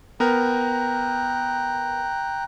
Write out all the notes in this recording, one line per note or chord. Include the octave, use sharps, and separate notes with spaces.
B3 A#4 G5 A#5 F#6